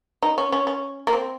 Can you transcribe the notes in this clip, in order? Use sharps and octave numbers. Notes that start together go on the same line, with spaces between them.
D#4
C#4
C#4
C#4
A#3
C4